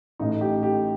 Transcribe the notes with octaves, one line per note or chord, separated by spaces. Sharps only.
A1 A2 D#4
G4
G4